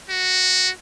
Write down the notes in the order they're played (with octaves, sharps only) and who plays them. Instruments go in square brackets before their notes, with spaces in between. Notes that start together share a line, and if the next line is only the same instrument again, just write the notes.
[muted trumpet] F#4